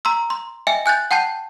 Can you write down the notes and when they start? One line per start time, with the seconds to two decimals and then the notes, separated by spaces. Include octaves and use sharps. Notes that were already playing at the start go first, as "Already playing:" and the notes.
0.05 A#5 C6 E6
0.30 C6
0.67 D#5 E5 G5 G#5 C#7
0.86 G#5 F#6 G6 A6
1.11 F#5 G5 A5 G6 C7